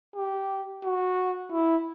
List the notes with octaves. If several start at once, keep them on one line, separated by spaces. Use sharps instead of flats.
G4
F#4
E4